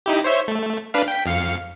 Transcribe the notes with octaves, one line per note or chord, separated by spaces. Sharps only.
D#4 E4 G4
C5 C#5 E5
A3
D4 B4 F5
G5 B6
F2 F5 C#7